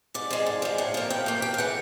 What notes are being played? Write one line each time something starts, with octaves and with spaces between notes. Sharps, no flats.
G#2 D5
F3 G#3
G#2
F3 G#3
A2
F3 A#3
A2 G5
F3 A#3
D2 G5
F5
C#3 E3 F#5